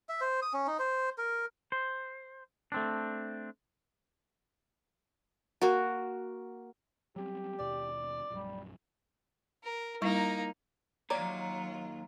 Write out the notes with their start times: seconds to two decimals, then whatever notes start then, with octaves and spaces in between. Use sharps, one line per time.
0.09 E5
0.21 C5
0.42 D#6
0.54 C#4
0.67 D#4
0.79 C5
1.18 A#4
1.72 C5
2.72 A3 C4 D4
5.61 A#3 F#4
7.16 F#3 G3 C4 G4
7.59 D#2 B2 D5
8.30 A#1 F#2 G3
9.63 A#4
10.02 G3 A#3 D#4 E4 C#6
11.10 D#2 F#3 F4 G4 C#5 D5 A#5